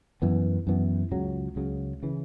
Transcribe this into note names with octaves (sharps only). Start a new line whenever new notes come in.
F#2 E3 B3
F#2 E3 B3
C#2 C#3 F#3
C#2 C#3 F#3
C#3 E3